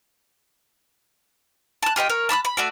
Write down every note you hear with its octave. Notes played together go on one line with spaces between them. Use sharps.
A5 F#6
F4 G4 D#5 G5
A#4 C#5
A5 B5 D6 F#6
B5
A3 F#4 D5